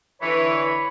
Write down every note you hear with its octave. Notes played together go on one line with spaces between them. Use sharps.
D3 E3 C#5 B5